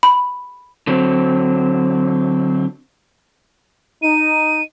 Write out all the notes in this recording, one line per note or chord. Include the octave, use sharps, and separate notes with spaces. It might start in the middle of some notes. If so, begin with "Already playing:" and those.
B5
D3 F#3 C4
D#4 D#7